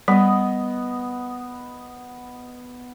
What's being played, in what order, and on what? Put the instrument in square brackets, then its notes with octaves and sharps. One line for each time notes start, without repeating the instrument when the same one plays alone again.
[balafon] G3 [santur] B3 D#5